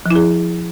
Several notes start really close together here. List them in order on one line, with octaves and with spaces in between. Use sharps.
F3 E4 G#4